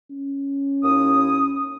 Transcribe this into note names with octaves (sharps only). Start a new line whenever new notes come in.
C#4
D#2 E4 D#6